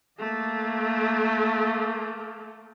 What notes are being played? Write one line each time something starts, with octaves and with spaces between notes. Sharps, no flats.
A3 A#3